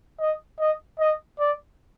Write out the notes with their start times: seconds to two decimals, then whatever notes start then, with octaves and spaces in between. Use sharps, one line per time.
0.20 D#5
0.59 D#5
0.99 D#5
1.39 D5